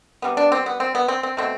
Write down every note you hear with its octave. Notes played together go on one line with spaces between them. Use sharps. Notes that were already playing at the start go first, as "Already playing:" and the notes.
C3 G3 B3
D4
C4
B3
C4
B3
C4
C4
B2 A3 C4